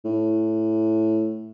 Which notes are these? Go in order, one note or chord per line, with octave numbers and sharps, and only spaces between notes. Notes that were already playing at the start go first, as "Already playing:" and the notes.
A2